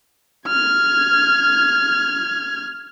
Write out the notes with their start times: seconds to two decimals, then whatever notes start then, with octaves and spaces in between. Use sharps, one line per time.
0.48 F6 G#6